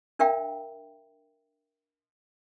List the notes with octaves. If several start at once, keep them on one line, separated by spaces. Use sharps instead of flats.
D4 A#4 E5 F5 G5 A#5